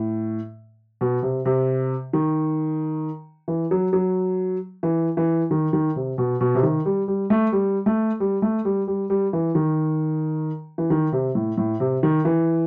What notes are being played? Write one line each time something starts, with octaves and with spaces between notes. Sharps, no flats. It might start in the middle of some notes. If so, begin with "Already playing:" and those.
Already playing: A2
B2
C3
C3
D#3
E3
F#3
F#3
E3
E3
D#3
D#3
C3
B2
B2
C3
D#3
G3
G3
A3
G3
A3
G3
A3
G3
G3
G3
E3
D#3
E3
D#3
C3
A2
A2
C3
D#3
E3